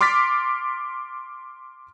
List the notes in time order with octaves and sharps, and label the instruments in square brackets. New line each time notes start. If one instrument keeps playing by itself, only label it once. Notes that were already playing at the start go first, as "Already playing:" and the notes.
[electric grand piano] C6 D6 F6 A6 B6